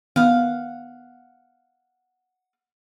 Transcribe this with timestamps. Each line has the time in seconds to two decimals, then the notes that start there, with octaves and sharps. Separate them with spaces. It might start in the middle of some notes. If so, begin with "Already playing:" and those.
0.16 D#3 B3 F5 F#5